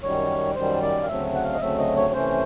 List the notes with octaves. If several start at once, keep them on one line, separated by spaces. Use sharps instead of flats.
F#2 D#3 G3 C#5
F#2 D#3 G3 C5
D5
F5
D2 C#3 F#3 A3 C4 E5
F#5
F5
D#5
D2 C#3 F#3 A3 C4 E5
D#5
C#5
C3 E3 A3 C#4 C5